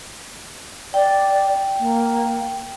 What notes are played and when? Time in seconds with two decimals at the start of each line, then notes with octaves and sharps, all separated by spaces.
0.94 D5 G5
1.79 A#3